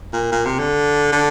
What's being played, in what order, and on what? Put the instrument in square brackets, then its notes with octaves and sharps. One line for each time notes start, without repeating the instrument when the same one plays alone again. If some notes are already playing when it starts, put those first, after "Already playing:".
[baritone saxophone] A#2
A#2
C3
D3
D3